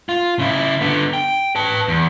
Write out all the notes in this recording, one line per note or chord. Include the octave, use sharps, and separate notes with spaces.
F4
C#3 E4
D3 B3
G5
B4 A5
E2